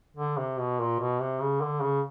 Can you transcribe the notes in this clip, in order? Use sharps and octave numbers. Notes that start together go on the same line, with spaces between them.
D3
C3
B2
A#2
B2
C3
C#3
D3
C#3